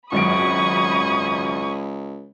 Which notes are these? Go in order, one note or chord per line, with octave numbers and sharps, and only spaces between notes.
G#1 C#2 F#2 B5 C#6 D#6 G#6 D7